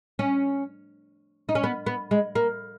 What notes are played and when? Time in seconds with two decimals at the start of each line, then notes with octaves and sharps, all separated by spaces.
0.19 C#4
1.49 D#4
1.55 C#4
1.64 B3
1.86 B3
2.11 G#3
2.35 A#3